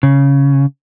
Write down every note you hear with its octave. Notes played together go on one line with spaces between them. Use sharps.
C#3